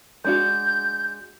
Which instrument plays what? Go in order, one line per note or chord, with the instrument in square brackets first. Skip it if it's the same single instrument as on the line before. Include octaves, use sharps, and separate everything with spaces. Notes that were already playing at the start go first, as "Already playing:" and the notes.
[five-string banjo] G#3 D4 F#4 [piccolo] G6